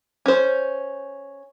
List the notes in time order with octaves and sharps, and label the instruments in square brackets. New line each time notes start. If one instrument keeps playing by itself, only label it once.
[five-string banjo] C#4 C5